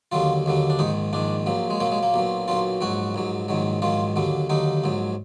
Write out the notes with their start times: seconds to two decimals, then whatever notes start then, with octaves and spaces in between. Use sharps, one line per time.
0.12 D#2 D3 F#3 F4
0.46 D#2 D3 F#3
0.70 D4
0.79 A#1 G#2 D#3 D#4
1.13 A#1 G#2 D#3 D4
1.46 A#1 A#2 F#3
1.70 G#3
1.80 A#1 A#2 F#3 A#3
1.92 G#3
2.03 A#3
2.14 B1 A#2 F#3
2.48 B1 A#2 F#3 F4
2.81 A#1 G#2 F#3 F#4
3.14 A#1 G#2 F#3
3.48 A#1 G#2 D#3 F#3
3.82 A#1 G#2 D#3 F#3 F4
4.16 D#2 D3 F#3
4.50 D#2 D3 F#3 D#4
4.84 A#1 G#2 F#3